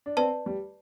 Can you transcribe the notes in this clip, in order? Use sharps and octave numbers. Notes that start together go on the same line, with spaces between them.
D4
C4 B4 D5 A5
G3